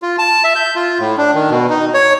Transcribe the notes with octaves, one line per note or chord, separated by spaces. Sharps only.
F4
A5
E5
G6
F4
A2
D4
D#3
B2
D#4
C#5